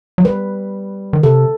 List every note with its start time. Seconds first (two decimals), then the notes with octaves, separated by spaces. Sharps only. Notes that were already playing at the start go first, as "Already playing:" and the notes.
0.18 F#3
0.25 G3 B4
1.13 D#3
1.23 C3 A4